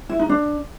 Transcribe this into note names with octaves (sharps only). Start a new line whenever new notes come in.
E4
D#4
D4